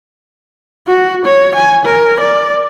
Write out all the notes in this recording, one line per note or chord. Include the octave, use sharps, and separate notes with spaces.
F#4
C#5
G#5
A#4
D5